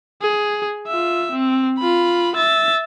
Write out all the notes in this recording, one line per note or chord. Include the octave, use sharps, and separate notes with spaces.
G#4
F4 E5
C4
F4 B5
E5 A6